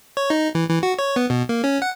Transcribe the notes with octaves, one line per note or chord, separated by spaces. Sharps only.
C#5
D#4
E3
E3
F#4
C#5
B3
B2
A#3
C#4
F#5